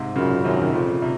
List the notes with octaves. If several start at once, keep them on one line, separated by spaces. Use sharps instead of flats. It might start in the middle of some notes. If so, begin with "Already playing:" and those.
Already playing: G#2 C3
F#2 A#2 C#3
F#2 C3 D#3
D#3
F2 A#2 C#3
C3